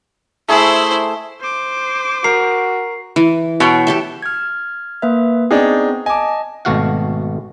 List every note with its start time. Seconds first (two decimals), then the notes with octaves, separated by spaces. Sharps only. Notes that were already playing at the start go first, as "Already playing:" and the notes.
0.48 A3 E4 G#4 C5
1.41 C5 D6
2.24 F#4 A#4 C7
3.16 E3
3.60 B2 C#5 G5
3.87 G4 A4 E5
4.22 F6 G#6
5.02 A#3 B4 E5
5.51 B3 C4 D4 D#4 G#4
6.06 D#5 G#5 A5 D6
6.65 G#1 B2 A3 F#4 F5 F#5